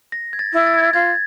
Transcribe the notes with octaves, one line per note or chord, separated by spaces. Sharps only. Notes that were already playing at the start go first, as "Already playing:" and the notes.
A#6
G#6
A6
E4
A6
G#6
A6
F4 G#6